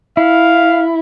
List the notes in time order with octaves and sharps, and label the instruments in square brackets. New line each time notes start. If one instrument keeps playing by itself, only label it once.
[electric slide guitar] E4 [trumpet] F5